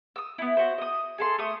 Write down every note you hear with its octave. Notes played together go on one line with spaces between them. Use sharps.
D#6 E6
B3 E4
F#4 C5
D#5 D#6
G#4 A4 C6
A3 D#6